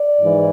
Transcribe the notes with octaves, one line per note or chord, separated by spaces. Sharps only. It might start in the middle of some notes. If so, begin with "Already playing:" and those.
Already playing: D5
G#2 E3